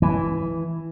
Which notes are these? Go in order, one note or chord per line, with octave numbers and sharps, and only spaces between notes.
E3